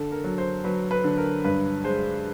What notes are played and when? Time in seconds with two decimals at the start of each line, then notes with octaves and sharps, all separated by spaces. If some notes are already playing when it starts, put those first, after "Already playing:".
Already playing: D3 A4
0.11 A#4
0.24 F#3
0.38 C5
0.64 F#3 B4
0.91 B4
1.04 D3
1.18 A#4
1.44 G2 B4
1.84 G#3 C5